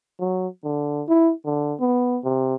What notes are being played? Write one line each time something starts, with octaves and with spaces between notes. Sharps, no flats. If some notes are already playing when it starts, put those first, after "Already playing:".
F#3
D3
E4
D3
B3
C3